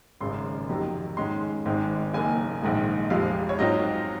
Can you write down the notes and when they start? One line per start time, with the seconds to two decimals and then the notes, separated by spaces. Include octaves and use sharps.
0.21 G#1 F#2 C#3 G#3 C6
0.69 F2 C3 D#3 F#3
1.17 G#2 D#3 G#3 C#4 C6
1.65 G#1 G#2 D#3 G#3 C4
2.14 F#1 F#2 D#3 A#3 G#5
2.62 A#1 G#2 D#3 G#3
3.10 F1 F2 C3 F3 G#3 F5
3.49 C#5
3.59 G#2 F#3 C4 F4 D#5